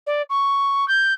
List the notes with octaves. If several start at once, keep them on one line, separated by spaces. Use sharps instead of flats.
D5
C#6
G6